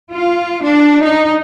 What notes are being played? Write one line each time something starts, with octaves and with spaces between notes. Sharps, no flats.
F4
D4
D#4